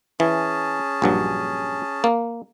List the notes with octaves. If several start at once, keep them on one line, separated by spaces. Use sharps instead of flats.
E3 C#4 G#4 A5
A#1 G2 F#3
A#3